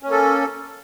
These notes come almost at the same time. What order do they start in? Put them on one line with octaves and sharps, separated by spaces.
C#4 A#3 A4